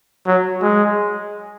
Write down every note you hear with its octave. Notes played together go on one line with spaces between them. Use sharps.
F#3
G#3